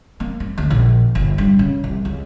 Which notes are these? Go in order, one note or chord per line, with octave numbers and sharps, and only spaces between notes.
A#3
A#3
D2
A#1
G1
G2
C#3
C2
C#2